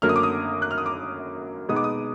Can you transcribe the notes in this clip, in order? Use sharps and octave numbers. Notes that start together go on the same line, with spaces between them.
F#2 D3 F#3 A#3 F6
D#6
D6
D#6
F#6
F6
D#6
D6
B2 G#3 B3 D#4 D#6
D6
D#6